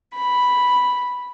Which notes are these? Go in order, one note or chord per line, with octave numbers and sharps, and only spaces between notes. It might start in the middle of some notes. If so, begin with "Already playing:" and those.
B5